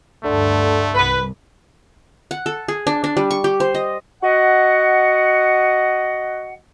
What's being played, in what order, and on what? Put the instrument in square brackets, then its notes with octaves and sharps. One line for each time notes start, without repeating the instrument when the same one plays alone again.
[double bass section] D2 G2 [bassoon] D3 [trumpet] A3
[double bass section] C2 [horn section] B4
[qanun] F#5
A4
G#4
D4
D4
G3
C#6
G4
C5
D#5
[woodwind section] F#4 D#5 F#5